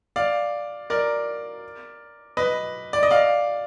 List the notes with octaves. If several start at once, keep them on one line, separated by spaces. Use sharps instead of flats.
D5 F5
A#4 D5
B4 D#5
D5
D#5
D5 F5